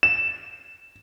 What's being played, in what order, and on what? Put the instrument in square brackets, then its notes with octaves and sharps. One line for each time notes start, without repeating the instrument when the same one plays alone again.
[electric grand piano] E7